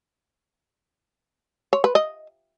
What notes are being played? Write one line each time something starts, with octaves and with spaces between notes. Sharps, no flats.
C#5
B4
D#5